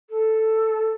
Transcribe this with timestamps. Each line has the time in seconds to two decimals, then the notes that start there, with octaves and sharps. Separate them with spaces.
0.10 A4